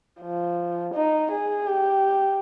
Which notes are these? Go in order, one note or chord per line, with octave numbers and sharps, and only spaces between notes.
F3
D#4
G#4
G4